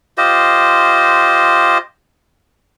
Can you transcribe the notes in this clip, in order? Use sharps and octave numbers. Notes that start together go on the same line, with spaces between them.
F4 G4 C5 D#5